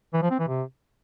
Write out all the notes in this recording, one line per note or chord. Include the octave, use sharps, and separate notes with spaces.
E3
F3
C4
E3
C3